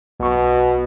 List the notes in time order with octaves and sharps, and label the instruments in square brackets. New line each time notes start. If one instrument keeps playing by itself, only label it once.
[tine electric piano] B1 C#6 [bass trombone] B2